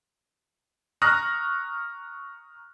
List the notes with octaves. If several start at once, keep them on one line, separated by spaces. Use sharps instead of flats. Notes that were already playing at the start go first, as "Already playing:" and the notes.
A#5 C#6 D#6 F6 F#6 A#6